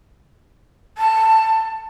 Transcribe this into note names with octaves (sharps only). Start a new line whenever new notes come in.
A5